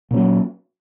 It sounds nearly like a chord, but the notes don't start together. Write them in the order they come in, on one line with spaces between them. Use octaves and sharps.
A#2 C#4 F#3